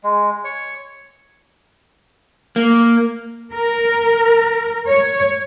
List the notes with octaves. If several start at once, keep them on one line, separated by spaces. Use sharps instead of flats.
G#3
C#5
A#3
A#4
C#5